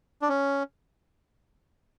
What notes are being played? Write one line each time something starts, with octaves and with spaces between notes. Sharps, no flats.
D4
C#4